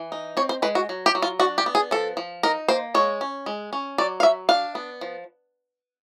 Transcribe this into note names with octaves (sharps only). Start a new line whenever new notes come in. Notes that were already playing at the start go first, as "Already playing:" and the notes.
Already playing: E3
D#4
C4 C#5
C5
G#3 B4
F#4
F#3
G4
F#3
F4
D4 F#4
G4
B3
G#4
F3 A4
F3
D#4 A#4
A#3 C5
G#3 C#5
C#4
G#3
C#4
F#3 D5
F5
F#3 E5
D4 F5
B3
F3